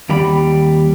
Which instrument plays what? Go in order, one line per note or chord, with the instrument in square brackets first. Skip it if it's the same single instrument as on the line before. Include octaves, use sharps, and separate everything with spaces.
[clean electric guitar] D#2 G3 D5 G5 B5